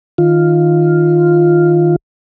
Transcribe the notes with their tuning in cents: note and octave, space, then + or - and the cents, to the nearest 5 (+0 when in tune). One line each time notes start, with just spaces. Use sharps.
D#3 +0 F4 +0